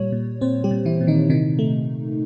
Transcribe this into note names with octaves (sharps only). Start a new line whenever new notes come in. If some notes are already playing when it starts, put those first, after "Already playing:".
Already playing: A#2 G3 C#5
A#2
A#2 C4 C5
G3 G4
A#2
E3 E4
A#2
D#3 D#4
C3 D#3 D#4
A3